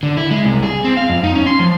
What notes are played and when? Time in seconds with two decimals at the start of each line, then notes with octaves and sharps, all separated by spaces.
0.03 D3
0.17 E4
0.31 G#3
0.45 C2
0.63 G#4
0.84 C4
0.97 F5
1.09 F2
1.24 D#4
1.35 C#4
1.46 C6
1.60 F3